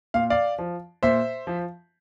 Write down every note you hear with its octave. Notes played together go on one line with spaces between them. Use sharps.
A#2 F5
D5 F5
F3
A#2 C5 E5
F3